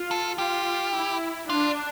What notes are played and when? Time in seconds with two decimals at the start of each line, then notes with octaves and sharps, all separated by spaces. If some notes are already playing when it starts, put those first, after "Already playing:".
Already playing: F4
0.11 A4
0.38 F4 G4
0.94 E4
1.49 D4 F4